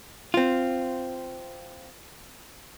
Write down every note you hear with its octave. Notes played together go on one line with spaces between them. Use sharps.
C4 F4